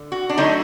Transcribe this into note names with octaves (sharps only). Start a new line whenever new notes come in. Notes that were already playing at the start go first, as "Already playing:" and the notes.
Already playing: D3
F#4
D4
D3 F#3 A3 D#4